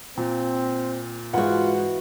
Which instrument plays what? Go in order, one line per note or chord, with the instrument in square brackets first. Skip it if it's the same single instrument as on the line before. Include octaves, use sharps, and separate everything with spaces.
[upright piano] A#2 [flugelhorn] C4
[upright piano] G#2 F#5 [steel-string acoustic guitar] E3 F#4 [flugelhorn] F4